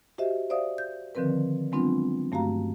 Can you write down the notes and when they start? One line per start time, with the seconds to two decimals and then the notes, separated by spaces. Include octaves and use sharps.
0.18 F#4 G4 C5 D#5 E5
0.50 C5 D5 E5 F5 D#6
0.78 G6
1.15 D3 D#3 F3 C4 A#4 B4
1.72 F#3 G#3 B3 C4 D4 F4
2.32 G2 A3 F#4 F5 A#5